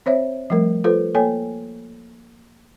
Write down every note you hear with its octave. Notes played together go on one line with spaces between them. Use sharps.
C4 C5 C#5 E5
F3 G3 A3 A#4
F4 A4 B4 C5
A#3 A4 C#5 G5 G#5